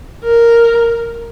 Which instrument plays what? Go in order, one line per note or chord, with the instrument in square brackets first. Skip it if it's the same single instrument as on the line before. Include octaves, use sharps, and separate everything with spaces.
[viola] A#4